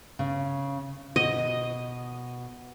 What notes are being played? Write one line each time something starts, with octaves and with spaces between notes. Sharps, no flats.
C#3
B2 D#5